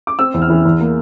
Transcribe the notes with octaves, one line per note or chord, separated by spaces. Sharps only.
D6
C4 E6
E2
F6
E3
E2
A#3